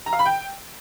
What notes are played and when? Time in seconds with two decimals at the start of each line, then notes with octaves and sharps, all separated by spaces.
0.06 A#5
0.13 F5
0.19 B5
0.25 G5